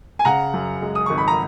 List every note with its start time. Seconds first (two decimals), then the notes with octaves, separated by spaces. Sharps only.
0.19 G#5
0.25 C#3 F#5 A#5
0.53 F#2
0.82 G#3
0.95 D#6
1.06 G#1 C#6
1.18 B5
1.28 A#5